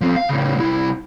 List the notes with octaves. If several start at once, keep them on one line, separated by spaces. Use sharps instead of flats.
F3 C4
F5
A2 C#3
C2 E4